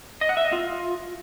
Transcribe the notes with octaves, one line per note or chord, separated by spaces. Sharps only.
D#5
F#5
E5
D#5
F4